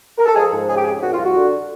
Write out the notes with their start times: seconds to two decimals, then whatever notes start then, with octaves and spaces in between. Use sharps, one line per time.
0.18 A#4
0.26 A4
0.35 F3 G#4
0.52 G#2
0.68 C#3 G#4
0.76 G4
0.84 F2 G#4
1.02 A#2 F#4
1.13 F4
1.18 C2
1.25 F#4
1.36 D3